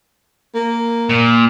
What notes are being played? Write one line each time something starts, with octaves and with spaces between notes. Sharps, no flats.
A#3
A#2